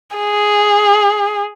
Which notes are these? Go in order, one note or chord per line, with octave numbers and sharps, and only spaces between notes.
G#4